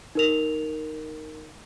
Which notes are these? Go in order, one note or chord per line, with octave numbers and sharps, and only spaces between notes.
D#4 A#4 F7